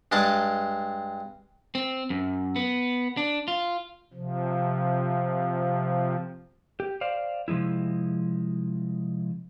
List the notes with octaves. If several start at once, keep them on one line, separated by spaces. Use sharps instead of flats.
G2 G#3 D#5 A5 D6
C4
F#2
B3
D4
F4
C3 F3
G4
C5 D5 F5
C3 F3 G3 G#3 E4